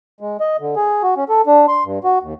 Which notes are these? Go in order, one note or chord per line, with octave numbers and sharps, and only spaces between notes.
G#3
D#5
D3
G#4
F#4
C#4
A4
D4
C6
G2
F#4
D#2